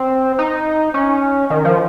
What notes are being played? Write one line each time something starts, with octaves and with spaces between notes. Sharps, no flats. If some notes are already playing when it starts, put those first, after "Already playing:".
Already playing: C4
D#4
C#4
D#3
F3